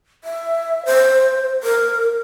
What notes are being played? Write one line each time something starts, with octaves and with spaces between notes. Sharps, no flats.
E5
C5
A#4